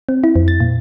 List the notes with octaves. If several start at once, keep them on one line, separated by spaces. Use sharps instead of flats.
C4
E4
F2
A6
A#2